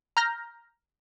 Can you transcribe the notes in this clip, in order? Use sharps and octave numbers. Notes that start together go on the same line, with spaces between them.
A#5 F6 G6 A#6